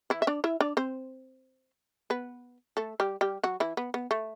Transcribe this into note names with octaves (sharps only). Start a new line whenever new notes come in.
E3 E4
E5
D4 D5
E4 E5
D4 D5
C4 C5
B3 B4
A3 A4
G3 G4
G3 G4
F#3 F#4
E3 E4
B3
B3
A3